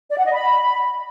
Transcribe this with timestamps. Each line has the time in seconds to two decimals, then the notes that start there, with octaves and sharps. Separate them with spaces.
0.11 D5
0.18 F#5
0.25 D#5
0.32 B5